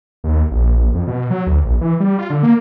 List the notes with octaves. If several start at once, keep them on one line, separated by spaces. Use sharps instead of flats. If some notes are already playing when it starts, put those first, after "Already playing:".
D#2
A#1
F2
B2
F#3
D2
A#1
E3
G3
F4
D3
A#3